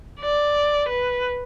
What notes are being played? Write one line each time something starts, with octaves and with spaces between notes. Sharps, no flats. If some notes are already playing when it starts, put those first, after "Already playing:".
D5
B4